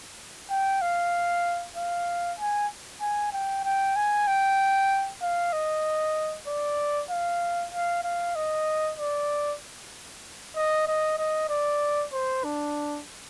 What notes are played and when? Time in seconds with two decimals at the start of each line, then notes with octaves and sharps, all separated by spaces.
0.50 G5
0.82 F5
1.76 F5
2.39 G#5
3.01 G#5
3.33 G5
3.64 G5
3.96 G#5
4.27 G5
5.22 F5
5.53 D#5
6.47 D5
7.10 F5
7.73 F5
8.04 F5
8.36 D#5
8.98 D5
10.56 D#5
10.87 D#5
11.18 D#5
11.49 D5
12.12 C5
12.44 D4